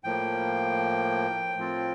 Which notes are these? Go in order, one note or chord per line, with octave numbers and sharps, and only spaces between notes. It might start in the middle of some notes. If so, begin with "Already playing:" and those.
A2 F3 A#3 G5
A2 F3 C4 F4